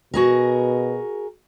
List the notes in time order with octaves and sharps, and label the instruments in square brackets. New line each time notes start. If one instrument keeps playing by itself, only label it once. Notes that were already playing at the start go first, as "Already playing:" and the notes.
[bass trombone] B2 [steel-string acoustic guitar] F#4 G#4 A#4